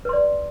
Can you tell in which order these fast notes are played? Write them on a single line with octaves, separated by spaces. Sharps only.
B4 C6 D5